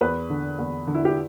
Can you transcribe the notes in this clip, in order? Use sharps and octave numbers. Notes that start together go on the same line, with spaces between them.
E2 B4
D3
E2
D3
E4
G4